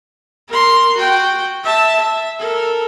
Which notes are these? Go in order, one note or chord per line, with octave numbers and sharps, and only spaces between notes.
A#4 C6
F#4 G5
E5 A5
E5
A4 A#4